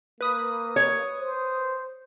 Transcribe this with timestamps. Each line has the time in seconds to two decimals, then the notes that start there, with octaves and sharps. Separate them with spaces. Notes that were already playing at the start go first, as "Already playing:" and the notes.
0.21 A#3 B4 D#6
0.76 C#5
1.19 C5